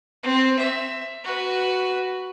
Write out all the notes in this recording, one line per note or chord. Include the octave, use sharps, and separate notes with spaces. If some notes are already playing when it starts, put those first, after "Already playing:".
C4
E5
F#4 B4